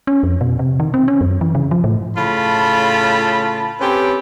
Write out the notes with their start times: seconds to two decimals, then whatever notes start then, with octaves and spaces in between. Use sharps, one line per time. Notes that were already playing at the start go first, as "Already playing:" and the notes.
0.07 C#4
0.23 F2
0.41 B2
0.59 C3
0.80 D#3
0.94 C4
1.08 C#4
1.21 F#2
1.41 E3
1.55 C#3
1.71 F3
1.84 A2
2.16 A2 C#3 F4 A5 B5
3.80 C4 C#4 G4 A4 B4